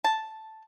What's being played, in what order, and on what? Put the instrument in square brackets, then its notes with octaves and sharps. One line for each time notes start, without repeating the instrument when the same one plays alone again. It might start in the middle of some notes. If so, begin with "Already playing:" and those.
[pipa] A5